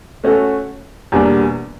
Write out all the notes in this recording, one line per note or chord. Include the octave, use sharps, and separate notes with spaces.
A3 C#4 F#4 A4
E2 B2 G3 A#3 D4